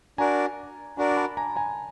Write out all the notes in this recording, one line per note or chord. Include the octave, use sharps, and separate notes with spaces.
D4 F#4 A#4 D5 G#5 A#5
D4 F#4 A#4 D5 G#5 A#5
A#5
A5 B5
G#5 A#5
G#5 A#5